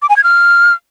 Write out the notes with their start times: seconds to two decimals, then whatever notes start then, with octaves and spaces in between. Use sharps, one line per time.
0.02 D6
0.09 G#5
0.16 G#6
0.24 F6